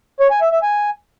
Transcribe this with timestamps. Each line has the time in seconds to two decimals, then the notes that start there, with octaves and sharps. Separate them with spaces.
0.20 C#5
0.31 G#5
0.41 E5
0.52 E5
0.63 G#5